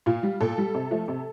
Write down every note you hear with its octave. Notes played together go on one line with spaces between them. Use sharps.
A#2 F4
G3
A#2 A4
G3
C3
F3 A3
C3